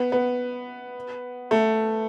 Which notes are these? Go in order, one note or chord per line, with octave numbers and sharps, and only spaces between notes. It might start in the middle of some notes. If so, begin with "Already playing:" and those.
Already playing: B3
B3
A3